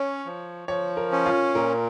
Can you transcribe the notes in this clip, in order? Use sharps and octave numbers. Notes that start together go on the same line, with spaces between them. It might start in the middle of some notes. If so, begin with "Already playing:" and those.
Already playing: C#4 C#5
F3
F3 C#5
A#4
C#4
F4
A#2 A#4